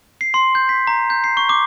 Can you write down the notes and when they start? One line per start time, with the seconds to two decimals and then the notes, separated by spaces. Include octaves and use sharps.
0.21 C7
0.34 C6
0.55 G6
0.69 B6
0.87 A#5
1.10 G6
1.24 C7
1.37 C#6
1.49 D6